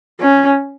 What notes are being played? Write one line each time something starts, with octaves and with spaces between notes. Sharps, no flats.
C#4